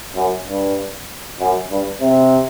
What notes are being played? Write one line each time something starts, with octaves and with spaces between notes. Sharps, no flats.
F#2
G2
F#2
G2
C3